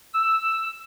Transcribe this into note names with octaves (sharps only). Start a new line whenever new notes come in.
E6